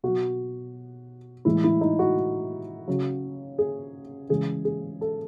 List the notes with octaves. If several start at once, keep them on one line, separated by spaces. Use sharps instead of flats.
B2 F#3 F#4
A2 E3 G#3 E4
E4
D#4
F#4
C#3 F#3
G#4
C#3 E3 G#3 G#4
G#4
A4